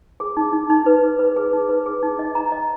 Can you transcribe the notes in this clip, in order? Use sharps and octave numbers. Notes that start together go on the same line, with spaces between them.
G#4
D#4
D#4
D#4
B4
G#4
B4
G#4
D#4
B4
G#4
D#4
D#5
A#5
D#5